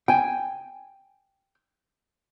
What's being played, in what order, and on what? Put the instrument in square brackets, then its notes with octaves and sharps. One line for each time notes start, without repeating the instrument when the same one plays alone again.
[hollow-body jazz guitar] G5 G#5